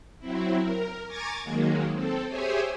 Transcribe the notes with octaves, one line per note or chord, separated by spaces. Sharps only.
F#3 C4 E4
A#4
G#5 A#5 C#6 D6 G#6 A6
D#3 F#3 G#3 A#3
C4 A4
G4 G#4 C5 C#5 E5 G#5